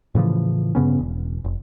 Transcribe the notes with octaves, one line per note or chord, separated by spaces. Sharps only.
A2 C#3 E3 F3
G2 C#3 B3 C#4
E1
F1